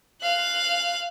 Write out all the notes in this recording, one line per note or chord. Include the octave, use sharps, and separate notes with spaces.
F5 F#6